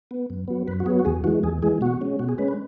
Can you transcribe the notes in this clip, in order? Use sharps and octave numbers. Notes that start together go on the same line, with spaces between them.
B3
F#2
F#3 B3
F#2 B4
F#4
F#3 B3 G#4
F#4
E2 G#4
E3 G#3 F#4
E2 G#4
E3 G#3 G#4
B2 F#4
G#3 C#4
B2 F#4
G#4
G#3 C#4 B4
B4